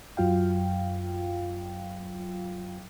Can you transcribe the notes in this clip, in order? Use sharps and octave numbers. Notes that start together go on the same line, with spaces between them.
F#2 F#3 F4 F5 G5